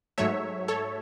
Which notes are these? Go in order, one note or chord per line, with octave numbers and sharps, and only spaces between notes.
G#2 F#3 A3 C#5 E5
A4 C#5